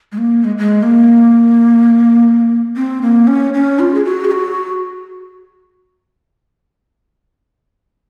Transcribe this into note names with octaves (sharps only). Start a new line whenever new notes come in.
G#3
A#3
G#3
G#3
A#3
C4
A#3
C#4
C#4
F4
G#4
F#4
G#4
F#4